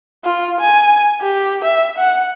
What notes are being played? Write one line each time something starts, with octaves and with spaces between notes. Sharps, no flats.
F4
G#5
G4
E5
F#5